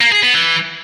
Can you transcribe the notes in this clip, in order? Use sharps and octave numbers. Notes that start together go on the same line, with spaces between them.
A#3
G#4
B3
E3